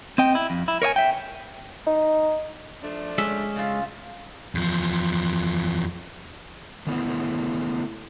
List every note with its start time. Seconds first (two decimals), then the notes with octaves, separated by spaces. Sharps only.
0.18 C4 D#5 G5
0.35 E4
0.50 F2
0.68 E4
0.82 A#4 C#5 D#5 G#5
0.96 E5 G5
1.87 D#4
2.83 F3 A3 D4
3.18 G#3 C#4 E5
3.56 C#3 F4
4.55 E2 F3
6.87 D#3 A3 B3 E4